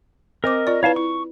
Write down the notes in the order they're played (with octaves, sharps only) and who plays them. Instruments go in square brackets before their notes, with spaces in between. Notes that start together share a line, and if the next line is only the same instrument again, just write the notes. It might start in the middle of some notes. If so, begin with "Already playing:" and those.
[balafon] C4 C5 D6 [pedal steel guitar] A#4 D#5
[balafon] F4 D5
[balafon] E4 B4 [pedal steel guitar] C#5 F5 A5
[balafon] E4 [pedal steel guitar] C#6